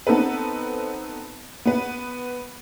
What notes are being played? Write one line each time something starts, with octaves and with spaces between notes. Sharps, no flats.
B3 C4 D#4 A4 B4
B3 B4